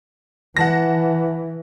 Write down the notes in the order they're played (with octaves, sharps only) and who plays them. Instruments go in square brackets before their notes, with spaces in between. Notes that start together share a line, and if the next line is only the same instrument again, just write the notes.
[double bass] E3 [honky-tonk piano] F#5 A5 A#6